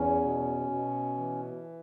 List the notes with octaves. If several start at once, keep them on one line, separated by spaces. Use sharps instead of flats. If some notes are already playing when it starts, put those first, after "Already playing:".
Already playing: E2 C#4
B2
B2
E3